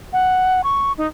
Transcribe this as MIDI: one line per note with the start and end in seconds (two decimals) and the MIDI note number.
0.13 0.61 78
0.64 0.92 85
0.98 1.07 63